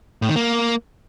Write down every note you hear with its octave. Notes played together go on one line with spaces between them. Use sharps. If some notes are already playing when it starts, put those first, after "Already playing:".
A2
D#3
A#3